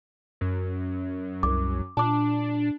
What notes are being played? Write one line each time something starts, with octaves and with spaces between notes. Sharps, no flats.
F#2
C2 D6
A#2 D4 A5 D6